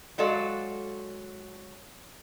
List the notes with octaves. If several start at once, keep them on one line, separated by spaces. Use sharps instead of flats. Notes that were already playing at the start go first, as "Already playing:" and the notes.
F#3 G#3 F#4 A4 D5 F5